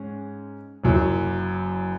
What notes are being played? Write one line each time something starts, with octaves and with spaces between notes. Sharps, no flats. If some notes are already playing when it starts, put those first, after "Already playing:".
Already playing: G#2 G#3 C#4
F#1 F#2 F#3 E4